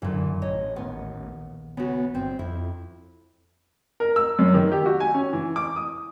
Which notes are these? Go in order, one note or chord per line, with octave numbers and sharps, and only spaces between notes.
F1 F#2 A#2 D3 E3 F#3
A1 C#5 D#5
A#1 D#2 B3
C#3 B3 F#4
G1 C4
F2 E4
A#4
E6
F#2
D#3
G4
F#4
G#5
C#4
E3
D6
D#6